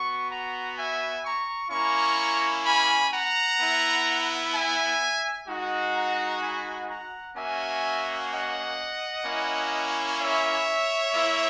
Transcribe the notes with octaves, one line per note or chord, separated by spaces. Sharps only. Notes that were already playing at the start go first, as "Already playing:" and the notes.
Already playing: B3 F#4 C#6
F#5 A#5
E5 G#5
A#5 C#6
A#3 C#4 E4 A#5 C#6
G#5 B5
F#5 A#5
B3 E4
E5 G#5
G#3 D#4 F#4
F#5 A#5
G#5 B5
F#5 A#5
A#3 C#4 F#4 E5 G#5
D#5 F#5
A#3 C#4 E4
C#5 E5
A#3 E4